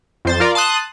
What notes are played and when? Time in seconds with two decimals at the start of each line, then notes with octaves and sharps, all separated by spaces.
0.25 F2 C5 A6
0.40 F4 A#4 D5 F5
0.55 A5 C6 D#6 F#6